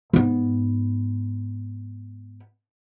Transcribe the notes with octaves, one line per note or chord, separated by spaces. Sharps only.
G#2 B3